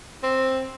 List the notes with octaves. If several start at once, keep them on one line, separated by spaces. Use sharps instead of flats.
C4